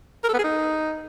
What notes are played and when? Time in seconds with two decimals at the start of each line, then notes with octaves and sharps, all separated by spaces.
0.24 A#4
0.29 A4
0.34 B3
0.39 G#4
0.44 D#4